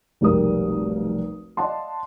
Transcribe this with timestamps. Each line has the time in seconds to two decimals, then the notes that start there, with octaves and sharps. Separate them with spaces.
0.21 F1 B1 G#2 G3 A#4 D#6
1.57 D5 D#5 F5 F#5 A5 C6